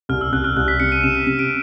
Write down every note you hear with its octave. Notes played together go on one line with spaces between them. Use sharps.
C2 F6
E6
C2 F#6
F6
C2 F#6
B6
C3 C#7
D#7
C3 E7
E7
C3 D#7
D7